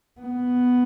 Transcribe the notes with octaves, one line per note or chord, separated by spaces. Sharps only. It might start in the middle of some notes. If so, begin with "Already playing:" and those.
B3